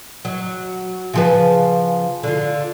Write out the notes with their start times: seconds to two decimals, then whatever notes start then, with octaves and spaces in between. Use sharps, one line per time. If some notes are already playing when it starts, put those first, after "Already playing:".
0.25 F#3
1.14 C#3 F3 B4
2.23 D3 F4